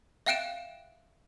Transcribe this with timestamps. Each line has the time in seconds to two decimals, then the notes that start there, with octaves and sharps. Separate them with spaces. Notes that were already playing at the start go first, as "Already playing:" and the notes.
0.26 E5 F5 G5 F#6 D7 E7